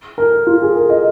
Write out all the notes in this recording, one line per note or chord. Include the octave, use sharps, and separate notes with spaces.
A#4
F4
G#4
A#4
D#5